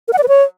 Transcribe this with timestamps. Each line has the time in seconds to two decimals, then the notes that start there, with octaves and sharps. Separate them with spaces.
0.08 A#4
0.13 F#5
0.18 D5
0.23 B4
0.28 C#5